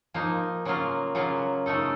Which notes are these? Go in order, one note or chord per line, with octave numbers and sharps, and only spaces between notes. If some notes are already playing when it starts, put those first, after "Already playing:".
F3 A#3 D#4
C#3 F#3 A#3 F4
C#3 F#3 A#3 F4
C#3 A3 D#4 A4